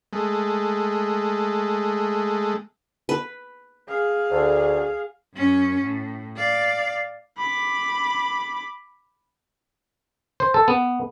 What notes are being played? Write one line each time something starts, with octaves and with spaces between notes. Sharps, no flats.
G#3 A3
B4
G#4 F5
D2
F#2 C#4
A2
D5 F5
B5 D6
C5
A4
B3